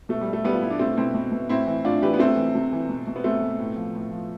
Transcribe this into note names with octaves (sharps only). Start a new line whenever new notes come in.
B2 A3
G3
B2
A3
B2 G3 B3
F4
B2 E4
D4
B2 A3 C4
B2 C4 E4
B2
B2
A2 C4 E4
E3
A2 D4 F4
E3 G4 B4
B3
C3 A3 C4
E3
C3
E3
B2
B2
B3
B2 A3 C4
B2
A2
F3
A2
F3